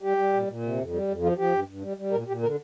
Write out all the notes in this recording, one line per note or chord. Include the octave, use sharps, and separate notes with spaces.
G3 G4
G3
A#2
A#2
C3
F2
G3
F2
F3 F4
F3 G4
G2
G2
G3
G3
A#2 A#4
A#2 G4
D3 A#4